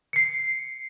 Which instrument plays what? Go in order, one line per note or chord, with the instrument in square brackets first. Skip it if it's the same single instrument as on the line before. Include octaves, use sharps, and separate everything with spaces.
[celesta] C7 C#7